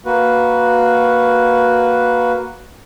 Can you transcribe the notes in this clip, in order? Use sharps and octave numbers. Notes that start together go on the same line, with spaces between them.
A#3 F#4 B4